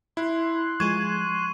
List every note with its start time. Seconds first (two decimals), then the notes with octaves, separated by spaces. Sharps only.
0.17 E4 C6 F#6
0.80 F3 G#3 G#4 C#6 G#6 D#7